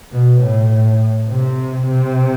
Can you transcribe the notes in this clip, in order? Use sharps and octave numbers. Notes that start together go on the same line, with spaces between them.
B2
A2
C3
C3